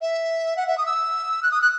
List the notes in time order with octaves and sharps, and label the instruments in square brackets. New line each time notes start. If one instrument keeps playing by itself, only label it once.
[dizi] E5
F#5
E5
D#6
E6
F#6
D#6
F#6